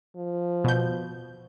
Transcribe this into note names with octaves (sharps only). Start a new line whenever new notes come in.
F3
B2 G6